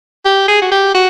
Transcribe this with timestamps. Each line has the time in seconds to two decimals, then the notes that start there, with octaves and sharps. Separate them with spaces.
0.25 G4
0.48 G#4
0.62 F#4
0.71 G4
0.95 F#4